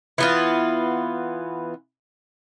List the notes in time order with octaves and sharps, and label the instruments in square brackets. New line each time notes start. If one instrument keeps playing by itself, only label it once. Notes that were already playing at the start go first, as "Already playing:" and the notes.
[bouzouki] E3 B3 F4